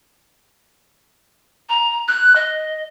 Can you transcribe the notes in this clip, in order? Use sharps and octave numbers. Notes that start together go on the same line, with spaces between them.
A#5
F#6
D#5